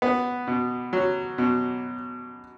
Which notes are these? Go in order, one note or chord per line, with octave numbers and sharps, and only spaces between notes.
B3
B2
F#3
B2